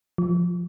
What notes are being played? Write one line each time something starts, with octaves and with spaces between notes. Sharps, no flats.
F3